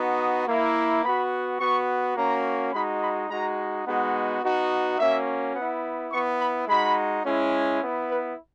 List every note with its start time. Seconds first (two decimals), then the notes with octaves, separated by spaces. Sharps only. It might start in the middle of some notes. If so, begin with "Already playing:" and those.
Already playing: B3 D#4 F#4
0.19 D#6
0.47 A#3 E4
1.04 B3 F#4 B5
1.60 B3 F#4 C#6
2.16 A#3 C#4 F#4 A#5
2.73 G#3 D#4 F#4 B5
3.02 B5
3.29 G#3 D#4 F#4 A#5
3.86 G#3 B3 D#4 F#4 F#5
4.43 B3 D#4 F#4
4.99 A#3 C#4 F#4 E5
5.55 B3 E4 F#5
6.12 B3 C#6
6.16 E4
6.40 B5
6.68 G#3 D#4 F#4 B5
7.24 G#3 C#4 E4
7.81 B3 E4
8.09 B4